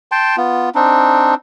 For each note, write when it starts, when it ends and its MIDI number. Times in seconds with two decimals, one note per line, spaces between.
0.12 0.36 79
0.12 0.36 81
0.12 0.36 84
0.37 0.70 59
0.37 0.70 65
0.75 1.35 60
0.75 1.35 62
0.75 1.35 63